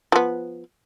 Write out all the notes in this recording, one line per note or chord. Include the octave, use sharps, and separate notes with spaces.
F3 B3